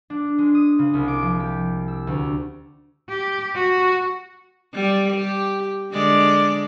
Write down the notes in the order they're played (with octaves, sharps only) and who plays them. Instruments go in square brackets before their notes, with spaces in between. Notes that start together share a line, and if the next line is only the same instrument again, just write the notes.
[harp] D4
G#3
D#6
C#3
C2
D6
F3
G4
E6
D2
[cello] G4
F#4
[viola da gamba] G3 D5
G4
D3 G#3 D5